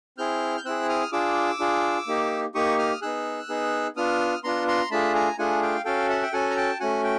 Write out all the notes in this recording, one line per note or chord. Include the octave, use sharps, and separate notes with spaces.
C4 E4 G#4 F6 G6
G6
C4 E4 G#4 E6 F#6
D#6 F6
D4 F4 G#4 D6 E6
D4 F4 G#4
A#3 D#4 G4
A#3 D#4 G4 C#6 D#6
D#6 F6
B3 D#4 G#4 E6 F#6
B3 D#4 G#4
B3 D4 F4 D#6 F6
B3 D4 F4 A#5 C6
A#5 C6
A3 D4 F4 G#4 A5 B5
G#5 A#5
A3 D4 F4 G#4 F#5 G#5
F5 G5
C#4 F#4 A4 F5 G5
E5 F#5
G5
C#4 F#4 A4 F#5 G#5
A#5
G5 A5
A3 C#4 F#4 F#5 G#5
G5